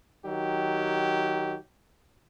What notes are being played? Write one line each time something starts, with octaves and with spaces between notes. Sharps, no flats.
D#3 F#3 G4